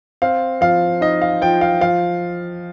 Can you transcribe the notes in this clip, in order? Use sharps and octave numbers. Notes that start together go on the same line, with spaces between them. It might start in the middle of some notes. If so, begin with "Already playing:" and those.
C4 F5
F3 F5
D#4 D#5
F5
F3 G5
F5
F3 F5